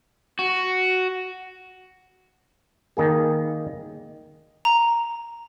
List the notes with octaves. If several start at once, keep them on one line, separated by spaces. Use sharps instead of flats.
F#4
D#3 A#3 G#4
A#5